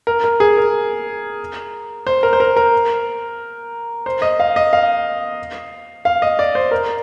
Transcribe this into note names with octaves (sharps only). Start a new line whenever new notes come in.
A#4
A#4
G#4
A#4
C5
A#4
C5
A#4
A#4
C5
D#5
F5
D#5
F5
F5
D#5
D5
C5
A#4